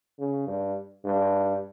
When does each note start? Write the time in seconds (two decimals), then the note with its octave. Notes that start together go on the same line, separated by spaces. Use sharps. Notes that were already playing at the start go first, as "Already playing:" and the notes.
0.19 C#3
0.47 G2
1.04 G2